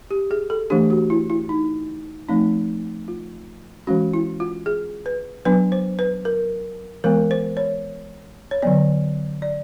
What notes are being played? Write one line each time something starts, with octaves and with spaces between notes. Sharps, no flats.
G4
G#4
A4
E3 A3 D4 G4
F#4
E4
E4
D#4
F3 A3 C4 D#4
F4
E3 G#3 C#4 F#4
E4
F4
G#4
B4
F#3 B3 D4 B4
C5
B4
A#4
E3 G#3 B3 A#4
C5
C#5
C#5
D3 F#3 B3 D5
D5